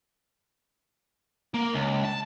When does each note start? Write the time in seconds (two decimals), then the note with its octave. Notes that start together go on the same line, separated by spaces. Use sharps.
1.54 A#3
1.73 C#2
2.05 A5